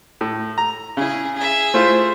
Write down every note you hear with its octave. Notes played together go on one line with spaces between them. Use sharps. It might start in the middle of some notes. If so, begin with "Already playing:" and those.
A2
A#5
C#3 E4 G#4
G#4 E5
A3 E4 F4 C5